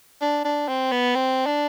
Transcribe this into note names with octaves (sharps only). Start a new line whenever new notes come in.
D4
D4
C4
B3
C4
D4